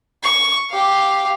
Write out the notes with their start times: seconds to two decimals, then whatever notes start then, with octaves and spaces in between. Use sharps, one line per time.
0.23 C#6
0.70 G4 F5